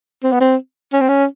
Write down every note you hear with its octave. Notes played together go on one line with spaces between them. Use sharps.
C4
B3
C4
C#4
C4
C#4